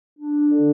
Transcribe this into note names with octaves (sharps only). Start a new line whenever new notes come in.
D4
D3